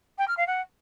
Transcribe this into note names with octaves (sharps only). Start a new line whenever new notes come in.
G5
F6
F5
F#5